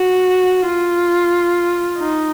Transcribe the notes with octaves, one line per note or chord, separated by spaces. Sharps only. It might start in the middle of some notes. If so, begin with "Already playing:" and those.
Already playing: F#4
F4
D#4